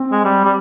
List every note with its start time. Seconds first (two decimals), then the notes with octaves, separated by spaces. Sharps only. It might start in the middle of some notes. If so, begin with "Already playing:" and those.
Already playing: C4
0.11 G#3
0.24 G3
0.45 G3